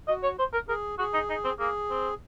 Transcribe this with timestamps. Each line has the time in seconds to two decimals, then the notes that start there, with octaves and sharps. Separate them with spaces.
0.08 F#4 D#5
0.23 C#5
0.39 C5
0.54 A#4
0.69 G#4 A#4
0.99 F#4 G#4
1.14 D#4
1.30 D#4
1.45 C4
1.59 A#3 G#4
1.90 C4